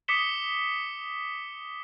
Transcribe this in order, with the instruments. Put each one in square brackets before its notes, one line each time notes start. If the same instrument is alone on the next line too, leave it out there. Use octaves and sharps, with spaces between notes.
[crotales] D6 D#6 B6 C#7 E7 G7